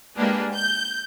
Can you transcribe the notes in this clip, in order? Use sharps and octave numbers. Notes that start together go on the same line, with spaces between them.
G#3 A#3 D4 G4 G#4 B4
G6